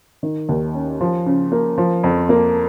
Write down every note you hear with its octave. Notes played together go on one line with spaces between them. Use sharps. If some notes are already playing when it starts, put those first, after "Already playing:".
D#3
D#2
C#4
F3
C#3
A#3
F3
F2
A#3